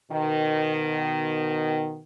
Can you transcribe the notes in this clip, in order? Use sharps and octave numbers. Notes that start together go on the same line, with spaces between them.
B2 D#3